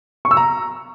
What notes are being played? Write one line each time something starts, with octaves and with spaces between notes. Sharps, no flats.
C#6
E6
A#5